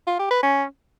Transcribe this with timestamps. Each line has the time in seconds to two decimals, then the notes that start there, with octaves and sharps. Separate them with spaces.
0.07 F4
0.19 G4
0.31 B4
0.43 C#4